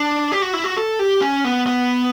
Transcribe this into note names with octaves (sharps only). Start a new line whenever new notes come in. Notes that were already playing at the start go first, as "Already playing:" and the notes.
Already playing: D4
G4
F#4
E4
F#4
A4
G4
C#4
B3
B3